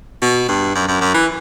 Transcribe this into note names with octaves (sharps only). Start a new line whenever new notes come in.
B2
G2
F#2
F#2
F#2
E3